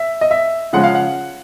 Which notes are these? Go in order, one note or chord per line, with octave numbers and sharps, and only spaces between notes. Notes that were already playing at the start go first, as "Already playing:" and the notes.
Already playing: E5
D#5
E5
C#3 F3 G#3 C#4 F#5
F5
F#5